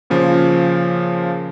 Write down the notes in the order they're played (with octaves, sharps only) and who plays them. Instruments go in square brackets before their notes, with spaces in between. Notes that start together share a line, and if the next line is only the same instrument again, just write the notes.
[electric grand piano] A#2 C#3 F3